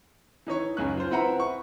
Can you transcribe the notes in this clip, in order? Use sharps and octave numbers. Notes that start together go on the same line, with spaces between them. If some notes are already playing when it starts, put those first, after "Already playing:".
E3 D#4 C#5 C#6
C#2 F#2 C#4 F#6
F4 C5
C4 E4 B4 F#5 A#5
C#6